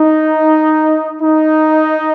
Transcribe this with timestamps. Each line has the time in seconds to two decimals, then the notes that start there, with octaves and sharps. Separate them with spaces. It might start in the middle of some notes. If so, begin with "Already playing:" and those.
Already playing: D#4
1.22 D#4